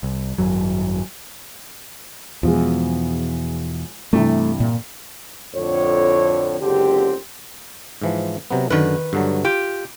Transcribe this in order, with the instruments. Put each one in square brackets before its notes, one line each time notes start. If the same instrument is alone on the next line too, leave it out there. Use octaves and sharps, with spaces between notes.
[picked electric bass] C2
G#1 F#2 F#3
[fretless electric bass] E2 B2 [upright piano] F3 G#3
[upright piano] G2 C3 E3 [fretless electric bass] A3
[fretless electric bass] A#2
[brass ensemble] F2 A2 D3 C#5
F#1 C#2 D3 C4 G4
[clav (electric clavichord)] G#2 E3 F3
C3 F#3 B3
[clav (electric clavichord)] F#2 D3 [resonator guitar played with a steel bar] D#3 B4
[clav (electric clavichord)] G2 D3 F#3
[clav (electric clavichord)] F4 [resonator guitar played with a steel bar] G4